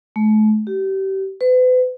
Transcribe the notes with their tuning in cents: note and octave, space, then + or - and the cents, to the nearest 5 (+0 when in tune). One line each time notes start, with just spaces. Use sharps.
A3 -40
G4 -30
B4 +40